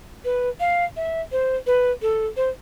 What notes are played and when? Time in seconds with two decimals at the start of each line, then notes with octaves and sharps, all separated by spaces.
0.25 B4
0.60 F5
0.97 E5
1.32 C5
1.67 B4
2.02 A4
2.37 C5